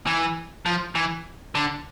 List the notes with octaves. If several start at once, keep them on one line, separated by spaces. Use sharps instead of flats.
E3
F3
E3
D3